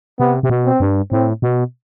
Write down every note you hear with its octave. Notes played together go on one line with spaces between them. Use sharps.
C3 B3
C3
B2
C4
G2
A2 C4
B2